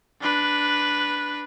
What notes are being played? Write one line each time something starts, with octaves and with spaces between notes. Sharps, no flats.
D4 B4